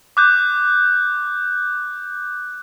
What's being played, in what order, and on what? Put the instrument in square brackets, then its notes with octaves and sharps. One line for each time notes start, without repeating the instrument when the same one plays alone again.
[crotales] D6 F#6 G6